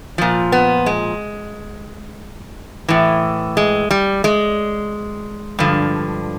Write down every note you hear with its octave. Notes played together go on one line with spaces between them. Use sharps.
A#2 F3
B3
G#3
A2 E3
G#3
G3
G#3
G2 D3 F3